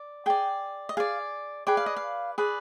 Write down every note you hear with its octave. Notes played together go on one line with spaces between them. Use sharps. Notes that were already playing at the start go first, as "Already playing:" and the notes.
Already playing: D5
G#4 D5 G5
D#5
G#4 D5 F5
G#4 B4 D5 G5
F5
D#5
F5
G#4 B4 D5